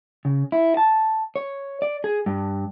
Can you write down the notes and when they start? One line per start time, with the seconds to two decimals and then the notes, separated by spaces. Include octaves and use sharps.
0.25 C#3
0.52 E4
0.77 A5
1.36 C#5
1.82 D5
2.04 G#4
2.26 G2